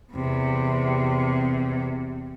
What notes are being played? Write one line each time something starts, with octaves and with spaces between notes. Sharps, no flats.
E2 C3